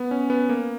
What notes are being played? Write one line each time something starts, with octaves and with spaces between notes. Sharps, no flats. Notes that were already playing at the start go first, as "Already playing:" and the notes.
Already playing: B3
C#4
B3
A#3